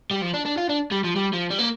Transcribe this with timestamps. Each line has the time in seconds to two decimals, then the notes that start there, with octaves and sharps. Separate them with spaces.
0.11 G3
0.21 F3
0.34 D4
0.45 D4
0.57 F4
0.69 D4
0.91 G3
1.04 F3
1.16 G3
1.33 F3
1.50 G3
1.58 A#3